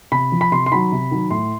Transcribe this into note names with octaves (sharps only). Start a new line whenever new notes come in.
C3 B5
F3
B5
C3 C6
C6
D#3 F#3 B5
C3
D#3 F#3
A2 C6